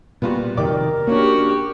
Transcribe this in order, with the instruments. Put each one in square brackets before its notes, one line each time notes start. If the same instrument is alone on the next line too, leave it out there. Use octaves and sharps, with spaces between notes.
[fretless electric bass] A#2 G3 [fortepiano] B3 F4 F#4
[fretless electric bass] F2 C3 D#3 [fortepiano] G4 D5 D6 [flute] A#4
[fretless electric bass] A#3 D4 [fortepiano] C#4 C#5 [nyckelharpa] F#4 G4